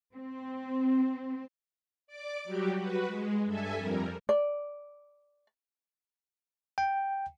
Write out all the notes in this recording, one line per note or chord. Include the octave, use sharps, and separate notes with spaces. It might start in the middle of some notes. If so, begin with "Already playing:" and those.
C4
D5 D6
F#3 G3 F#4 G4
F#4 B4
G#3
G2 A4 E5 G#5
F2 G3 A#4
D5
G5